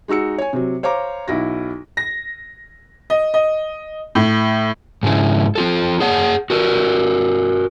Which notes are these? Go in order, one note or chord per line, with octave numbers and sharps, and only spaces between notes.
G#3 D#4 F#4 E6 C#7
C#5 G#5
C3 F#3
C5 C#5 F5 A#5 D6
B1 E4 F#4 A#6
A#6
D#5
D#5
A2
G#2 C#3 G#3 E4
C4 F4 A4
G#4 C#5 F#5
F#4 A#4 B4